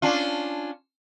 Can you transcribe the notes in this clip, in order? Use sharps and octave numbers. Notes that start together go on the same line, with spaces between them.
C#4 D4 F4